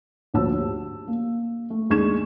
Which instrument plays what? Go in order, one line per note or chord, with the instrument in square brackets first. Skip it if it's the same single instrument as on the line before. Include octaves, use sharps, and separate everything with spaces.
[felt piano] D2 A#2 F3 C#5 A5 E6
G4
A#3
A3
D#2 G#3 D4 C#6 G#6 E7